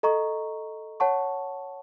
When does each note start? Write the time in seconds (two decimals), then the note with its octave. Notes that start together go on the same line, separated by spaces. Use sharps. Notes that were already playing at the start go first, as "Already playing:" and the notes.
0.03 A4 D#5 A#5 C#6
1.00 C#5 F#5 A5 C#6